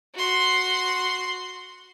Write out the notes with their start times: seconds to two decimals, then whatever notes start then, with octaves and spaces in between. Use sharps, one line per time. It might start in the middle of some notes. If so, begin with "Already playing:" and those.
0.15 F#4 C6